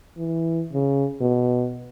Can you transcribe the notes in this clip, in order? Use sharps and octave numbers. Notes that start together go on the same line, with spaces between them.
E3
C#3
B2